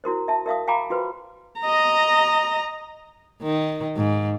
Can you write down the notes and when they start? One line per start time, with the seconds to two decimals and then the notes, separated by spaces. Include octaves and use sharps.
0.04 E4 F#4 A#4 C5
0.28 E5 A5
0.46 A#4 E5 F5 D#6
0.67 F5 G5 G#5 A#5 B5 D6
0.90 F4 F#4 B4 C5
1.61 D#5 A#5
3.42 D#3
3.97 G#2